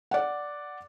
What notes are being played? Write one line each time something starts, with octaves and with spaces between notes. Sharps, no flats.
D5 F#5